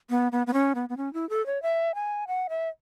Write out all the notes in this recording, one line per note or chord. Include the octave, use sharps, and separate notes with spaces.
B3
B3
B3
C#4
B3
B3
C#4
E4
A4
C#5
E5
G#5
F#5
E5